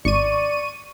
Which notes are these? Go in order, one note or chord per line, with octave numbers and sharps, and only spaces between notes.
G#1 D5 C#6 D#7